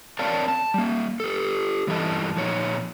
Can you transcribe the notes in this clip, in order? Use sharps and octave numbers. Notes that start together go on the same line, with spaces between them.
C4 A#4 C#5 D5 F5 A5
A5
G3 A#3
G4 A4
G2 E3 E4 A4 D#5 A5
A#2 F3 D#4 C#5